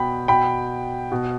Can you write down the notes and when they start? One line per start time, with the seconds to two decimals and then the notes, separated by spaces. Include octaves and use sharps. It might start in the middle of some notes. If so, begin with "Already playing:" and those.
Already playing: B2 G5 B5
0.28 B2 G5 B5
1.12 B2